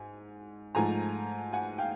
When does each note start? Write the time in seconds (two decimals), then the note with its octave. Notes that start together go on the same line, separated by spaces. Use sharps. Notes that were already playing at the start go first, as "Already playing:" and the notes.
Already playing: G#2 G#5
0.75 G#2 F3 A3 G#5 A#5
1.52 F#5 G#5
1.78 F5 G5